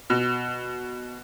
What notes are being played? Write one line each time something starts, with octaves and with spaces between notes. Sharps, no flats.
B2